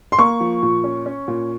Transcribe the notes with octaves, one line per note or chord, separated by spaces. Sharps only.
C6
A#3 C#6
F3
A#2
C#4
C#4
A#2